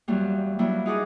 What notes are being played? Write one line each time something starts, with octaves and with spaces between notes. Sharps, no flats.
E2 F#3 G3 A#3
F#3 G3 A#3 D4 E4
D#4 F4 G#4 D#5 F#5 D6